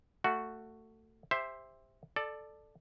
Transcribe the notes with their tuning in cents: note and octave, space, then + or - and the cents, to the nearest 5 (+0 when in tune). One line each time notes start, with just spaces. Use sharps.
A3 +20 F#4 +0 F#5 +0
G4 +30 C5 +0 E5 +0
A4 +0 D5 +15